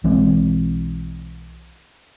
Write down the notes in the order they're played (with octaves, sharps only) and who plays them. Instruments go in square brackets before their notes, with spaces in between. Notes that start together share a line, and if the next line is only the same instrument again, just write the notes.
[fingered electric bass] B1 E3 G#3 C4